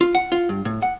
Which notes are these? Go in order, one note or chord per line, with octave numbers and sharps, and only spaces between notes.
F4
F#5
F4
G2
A2
F#5